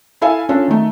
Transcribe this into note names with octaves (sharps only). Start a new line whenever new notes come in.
E4 A4 F5 G#5
C#4 D4 F4 A4 C#5
D#3 A3